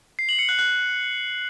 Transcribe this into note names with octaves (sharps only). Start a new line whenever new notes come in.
C7
F#7
C#7
F#6
F#6